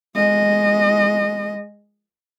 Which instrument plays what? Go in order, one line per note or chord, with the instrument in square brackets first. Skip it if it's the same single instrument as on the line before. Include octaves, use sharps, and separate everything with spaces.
[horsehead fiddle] G#3 D#5